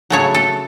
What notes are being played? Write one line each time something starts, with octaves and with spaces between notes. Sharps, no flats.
C#3 F#3 A3 C#5
A4